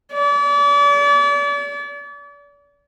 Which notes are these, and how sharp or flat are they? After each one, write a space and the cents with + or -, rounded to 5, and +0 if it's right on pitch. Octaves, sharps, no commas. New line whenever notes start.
D5 -40